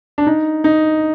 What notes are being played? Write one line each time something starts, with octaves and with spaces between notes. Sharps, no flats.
D4
D#4
D#4